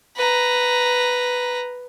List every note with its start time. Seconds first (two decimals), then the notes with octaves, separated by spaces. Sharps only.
0.16 B4 A#5